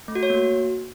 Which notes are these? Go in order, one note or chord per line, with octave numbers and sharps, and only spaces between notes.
A3
F#4
C#5
A#3
F#4